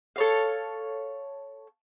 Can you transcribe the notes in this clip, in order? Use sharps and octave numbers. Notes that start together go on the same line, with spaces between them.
A4 C#5 F5